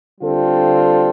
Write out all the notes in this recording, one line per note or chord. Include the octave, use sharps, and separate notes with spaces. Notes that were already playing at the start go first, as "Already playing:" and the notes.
D3 G3 C4 F4 A4